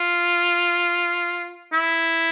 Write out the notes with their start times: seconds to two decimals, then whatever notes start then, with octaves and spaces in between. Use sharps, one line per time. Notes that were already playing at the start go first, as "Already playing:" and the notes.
Already playing: F4
1.73 E4